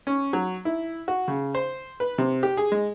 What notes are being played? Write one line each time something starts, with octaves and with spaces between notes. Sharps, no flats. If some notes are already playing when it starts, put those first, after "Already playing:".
C#4
F#3
E4
F#4
C#3
C5
B4
C3
G4
G#4
G#3